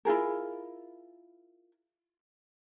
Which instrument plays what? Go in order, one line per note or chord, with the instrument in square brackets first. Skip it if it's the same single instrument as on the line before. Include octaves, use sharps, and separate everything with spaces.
[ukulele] E4 F4 G#4 A#4